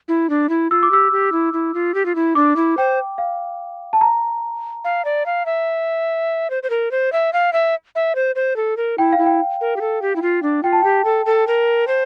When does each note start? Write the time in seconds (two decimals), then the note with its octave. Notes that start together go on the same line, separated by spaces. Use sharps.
0.08 E4
0.30 D4
0.49 E4
0.70 F4 E6
0.83 D6
0.91 G4 E6
1.12 G4
1.32 E4
1.53 E4
1.74 F4
1.94 G4
2.06 F4
2.15 E4
2.35 D4 D6
2.56 E4
2.77 C5 G5
3.18 F5
3.93 A5
4.01 A#5
4.84 F5
5.05 D5
5.26 F5
5.46 E5
6.50 C5
6.63 C5
6.70 A#4
6.91 C5
7.13 E5
7.33 F5
7.53 E5
7.95 E5
8.15 C5
8.36 C5
8.56 A4
8.77 A#4
8.98 E4 G5
9.13 F5
9.18 E4
9.26 G5
9.61 A#4
9.76 G4
9.81 A4
10.02 G4
10.16 E4
10.22 F4
10.43 D4
10.63 F4 G5
10.73 A5
10.82 G4 G5
11.05 A4
11.26 A4
11.47 A#4
11.87 C5